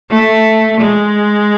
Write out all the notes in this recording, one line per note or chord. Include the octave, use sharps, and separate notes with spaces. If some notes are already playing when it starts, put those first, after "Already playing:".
A3
G#3